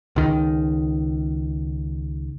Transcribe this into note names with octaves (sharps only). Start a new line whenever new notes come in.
C#2 D#3